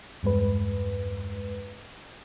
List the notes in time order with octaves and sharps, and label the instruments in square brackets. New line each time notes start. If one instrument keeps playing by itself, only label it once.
[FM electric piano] E2 G2 G#3 B4